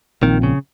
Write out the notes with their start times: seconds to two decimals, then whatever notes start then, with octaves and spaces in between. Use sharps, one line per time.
0.22 A#1 A#2 D#3 F3 C4
0.43 C#3